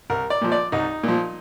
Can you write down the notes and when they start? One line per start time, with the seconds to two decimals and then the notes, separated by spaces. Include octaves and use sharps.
0.10 C2 A#4
0.30 D5
0.41 A#2 F3
0.52 D5
0.72 C2 D#4
1.03 A#2 F3